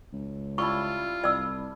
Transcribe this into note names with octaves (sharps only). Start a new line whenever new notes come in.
C#2
G3 E4 F4 A5 C#6
C2 D5 E6